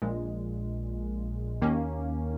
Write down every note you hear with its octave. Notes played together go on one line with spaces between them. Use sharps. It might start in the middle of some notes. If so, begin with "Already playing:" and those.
A#1 A#2 G#3
D#2 D#3 A#3 C#4